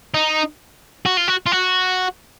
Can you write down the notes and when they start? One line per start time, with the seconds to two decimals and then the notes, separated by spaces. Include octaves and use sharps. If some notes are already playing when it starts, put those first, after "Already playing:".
0.14 D#4
1.06 F#4
1.17 F4
1.28 F#4
1.46 F4
1.52 F#4